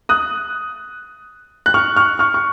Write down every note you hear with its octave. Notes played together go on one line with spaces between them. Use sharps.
D#6 F#6
F#6
C#6 F6
C#6 F6
C#6 F6
C#6